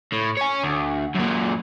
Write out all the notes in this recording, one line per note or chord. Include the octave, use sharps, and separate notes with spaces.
A2
C#5 G#5
D2
F#2 A#2